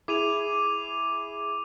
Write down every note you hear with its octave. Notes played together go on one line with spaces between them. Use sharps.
E4 G#4 D6 D#7 F7